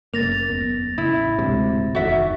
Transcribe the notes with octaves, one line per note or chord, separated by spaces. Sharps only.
F#1 A#3 A6 A#6 F7
E2 B3
A1 C#3 E4
D1 D2 C3 G#3
F#1 E2 D#3 F#4 E5